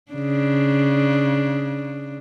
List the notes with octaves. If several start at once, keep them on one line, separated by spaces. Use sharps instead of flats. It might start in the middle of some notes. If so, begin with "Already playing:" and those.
C#3 D4